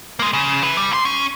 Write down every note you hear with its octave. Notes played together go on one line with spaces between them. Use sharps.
G#3 A#3
C#3
E4 B4
G3
F#2 C6
C#4